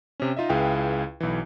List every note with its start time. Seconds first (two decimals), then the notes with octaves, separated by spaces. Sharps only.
0.20 C3 C#4
0.36 D#4 F4 D#5 E5
0.49 C#2 E4 G#4 B4 F5 G5
1.20 B1 E3